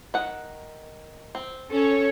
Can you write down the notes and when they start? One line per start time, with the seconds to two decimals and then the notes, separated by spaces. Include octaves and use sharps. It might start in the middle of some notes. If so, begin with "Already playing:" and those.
0.14 D#3 F#5
1.35 C4
1.71 C#4 A4 C#5